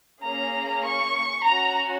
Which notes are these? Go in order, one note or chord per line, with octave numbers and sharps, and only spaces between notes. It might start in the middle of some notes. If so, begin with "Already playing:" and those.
A#3 C#4 G#4 A#5
C#6
C#4 F#4 A#5